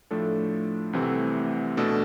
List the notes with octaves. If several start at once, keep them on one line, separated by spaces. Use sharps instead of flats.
A2 F3 A3 D4 A4
C2 C3 E3 A3 C4
B2 A3 D4 A4